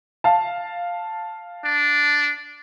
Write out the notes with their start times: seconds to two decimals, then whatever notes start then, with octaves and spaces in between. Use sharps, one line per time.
0.24 F5 A5
1.65 D4